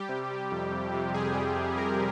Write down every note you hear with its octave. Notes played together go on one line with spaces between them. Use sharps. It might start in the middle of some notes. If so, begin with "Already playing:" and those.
Already playing: G3 G4
C3
G3
F2
F2
C3
C3 G#4
G3
F2
F2 A#4